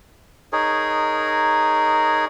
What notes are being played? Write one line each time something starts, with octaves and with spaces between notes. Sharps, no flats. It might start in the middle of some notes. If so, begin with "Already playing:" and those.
D#4 G#4 A#4 C#5